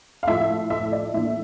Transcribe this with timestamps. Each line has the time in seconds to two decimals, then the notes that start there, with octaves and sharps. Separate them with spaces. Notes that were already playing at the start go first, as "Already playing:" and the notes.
0.23 F5
0.27 A2 F3 A3 E5
0.70 E5
0.92 D5
1.14 A2 E3 A#3 D4 E5